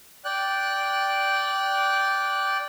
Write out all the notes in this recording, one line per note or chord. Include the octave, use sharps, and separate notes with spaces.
D5 G5 F#6